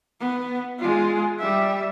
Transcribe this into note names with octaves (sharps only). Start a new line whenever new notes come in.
B3
G#3 F4
G3 E5